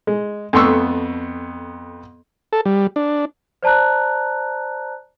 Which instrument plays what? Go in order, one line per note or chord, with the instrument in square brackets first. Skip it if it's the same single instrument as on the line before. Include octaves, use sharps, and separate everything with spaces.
[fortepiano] G#3
F2 A3 B3 C6 C#6 E6
[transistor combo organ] A4
G3
D4
[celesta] C5 D5 A5 A#5 F#6